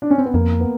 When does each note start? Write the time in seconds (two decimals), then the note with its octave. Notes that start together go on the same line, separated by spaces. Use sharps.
0.02 D4
0.10 C#4
0.18 C4
0.26 B3
0.34 F2 A#3
0.60 B3